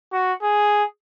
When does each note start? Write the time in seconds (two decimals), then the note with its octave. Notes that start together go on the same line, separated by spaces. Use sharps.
0.12 F#4
0.42 G#4